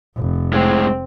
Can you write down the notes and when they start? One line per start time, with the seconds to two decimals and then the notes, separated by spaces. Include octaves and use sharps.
0.16 F1
0.53 A2 G#3 C4